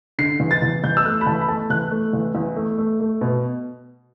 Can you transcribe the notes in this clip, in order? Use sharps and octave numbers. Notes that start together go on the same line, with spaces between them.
D3 C7
E2
A6
E2
E2 G6
E6
A3 F#6
B5
E2 A5
B5
A3 A5
E2 F#6
A3
E2
E2
A3
A3
A3
B2